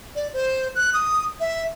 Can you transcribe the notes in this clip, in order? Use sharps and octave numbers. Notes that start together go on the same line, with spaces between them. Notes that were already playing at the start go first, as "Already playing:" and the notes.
D5
C5
F#6
D#6
E5